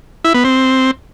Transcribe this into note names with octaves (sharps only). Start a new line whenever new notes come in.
E4
B3
C4